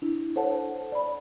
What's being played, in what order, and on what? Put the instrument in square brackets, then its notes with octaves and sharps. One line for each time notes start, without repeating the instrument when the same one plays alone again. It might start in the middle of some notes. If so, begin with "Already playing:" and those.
[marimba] D4 E4
A4 C5 C#5 F#5 A5
D5 B5